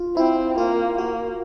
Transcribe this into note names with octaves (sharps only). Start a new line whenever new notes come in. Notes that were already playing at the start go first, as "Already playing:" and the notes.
Already playing: F4
C4 E4
A#3 F4
A#3 F#4